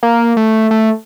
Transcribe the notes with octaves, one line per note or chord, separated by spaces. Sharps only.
A#3
A3
A3